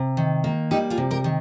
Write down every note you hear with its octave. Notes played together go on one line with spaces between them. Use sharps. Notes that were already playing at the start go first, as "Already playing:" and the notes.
Already playing: C3
D#3
A#3
G3 D#4 G4
F4 G#4
C3
G4 A#4
D#3